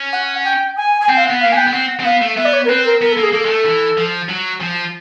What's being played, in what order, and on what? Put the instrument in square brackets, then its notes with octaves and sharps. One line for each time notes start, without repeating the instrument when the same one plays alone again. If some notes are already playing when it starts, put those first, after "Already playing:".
Already playing: [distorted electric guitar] C#4
[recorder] F#5
G5
G#5
G#5
[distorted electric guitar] C4 [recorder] G5
[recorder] F5
F#5
[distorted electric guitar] B3
[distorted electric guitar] A#3 [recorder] F5
[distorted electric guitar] B3 [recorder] G#5
[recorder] G5
[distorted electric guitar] B3
[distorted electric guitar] C4 [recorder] F#5
[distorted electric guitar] C4
[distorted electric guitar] B3 [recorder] F5
[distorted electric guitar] A3
[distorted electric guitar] B3 [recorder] E5
[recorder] D5
C#5
A#4
[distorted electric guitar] C4 [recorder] B4
[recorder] A#4
[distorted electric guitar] B3 [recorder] A#4
[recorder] A4
[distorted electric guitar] A#3
[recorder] G#4
[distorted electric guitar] A#3 [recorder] A4
[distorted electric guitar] G#3
A3
E3
F3
F#3
F3